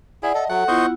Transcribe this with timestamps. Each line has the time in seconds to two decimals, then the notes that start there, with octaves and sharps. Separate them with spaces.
0.23 E4 G#4 D5 F#5
0.35 A4 D#5 E5 F#5 A5
0.50 F#3 A4 F#5
0.68 B3 E4 F4 C5 D#5 C#6